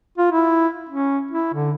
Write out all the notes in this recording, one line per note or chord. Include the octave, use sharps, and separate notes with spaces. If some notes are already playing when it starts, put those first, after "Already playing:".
F4
E4
C#4
E4
D3